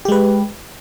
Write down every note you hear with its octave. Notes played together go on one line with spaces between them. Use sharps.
G#3 G4 B4